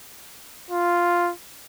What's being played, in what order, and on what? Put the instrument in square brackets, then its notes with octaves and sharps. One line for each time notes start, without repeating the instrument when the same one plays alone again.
[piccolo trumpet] F4